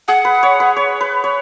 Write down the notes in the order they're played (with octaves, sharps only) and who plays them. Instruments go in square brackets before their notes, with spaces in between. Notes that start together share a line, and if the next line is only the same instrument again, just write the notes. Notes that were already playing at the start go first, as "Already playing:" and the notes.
[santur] G#4 [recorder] F#5
[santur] B4
C#5
B4
C#5
B4
C#5